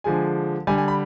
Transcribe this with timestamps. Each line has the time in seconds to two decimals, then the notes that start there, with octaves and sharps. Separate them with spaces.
0.04 D3 F3 G#3 G#5
0.67 D3 G3 G#5
0.78 G#5
0.88 B5